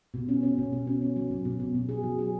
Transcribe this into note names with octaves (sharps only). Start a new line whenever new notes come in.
B2
C#4
C#4
B2
B2
C#4
C#4
F#3
B2
B2
B2
B2
G#4
F#3
G#4